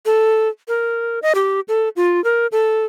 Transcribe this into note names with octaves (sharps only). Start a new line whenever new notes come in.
A4
A#4
D#5
G4
A4
F4
A#4
A4